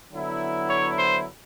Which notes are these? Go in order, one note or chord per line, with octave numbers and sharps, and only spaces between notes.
D3 F#3 B3 E4
C#5
C5